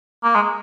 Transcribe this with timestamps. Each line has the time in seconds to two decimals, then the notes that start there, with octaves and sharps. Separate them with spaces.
0.24 A#3
0.35 G#3